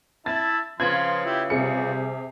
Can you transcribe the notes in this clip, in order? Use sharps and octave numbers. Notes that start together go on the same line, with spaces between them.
E4 E5 A5 A6
C#3 F3 F4 B4 C6 G#6
E4 G4
C3 G3 G#4 C#7